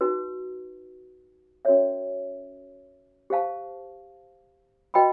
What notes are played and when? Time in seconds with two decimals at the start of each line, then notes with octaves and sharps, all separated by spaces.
0.01 D#4 F#4 B4
1.65 C#4 F#4 A#4 C#5 E5
3.30 G4 C5 F5 A5
4.94 F#4 B4 D#5 G5 B5